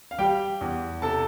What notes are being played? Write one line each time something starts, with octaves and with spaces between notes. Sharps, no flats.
F5
G3 G4 G5
E2
C3 A4 A5